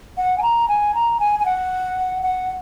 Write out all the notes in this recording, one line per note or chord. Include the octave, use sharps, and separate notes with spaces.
F#5
G#5
A#5
G#5
A#5
G#5
G#5
F#5
F#5